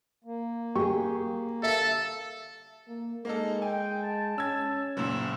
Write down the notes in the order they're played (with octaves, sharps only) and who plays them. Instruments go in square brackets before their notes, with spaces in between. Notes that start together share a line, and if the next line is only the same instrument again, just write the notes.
[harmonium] A#3
[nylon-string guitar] G4 G#4 [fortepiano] C#6
[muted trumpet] A4 [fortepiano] E5
[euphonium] A#3
[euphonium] G#3 [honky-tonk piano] A#3 D#4 A4
[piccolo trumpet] G5 [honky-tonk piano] G#5
[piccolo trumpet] A5
[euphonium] C#4 [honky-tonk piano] E6 G#6
[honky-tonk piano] F#1 A#2 [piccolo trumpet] E6